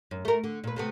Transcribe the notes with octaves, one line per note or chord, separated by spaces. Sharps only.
F#2
A3 A#4
D3
A#2 B4
C3 A3 B3